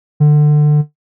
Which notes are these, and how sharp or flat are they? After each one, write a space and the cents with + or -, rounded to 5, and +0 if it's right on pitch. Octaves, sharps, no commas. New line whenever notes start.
D3 +25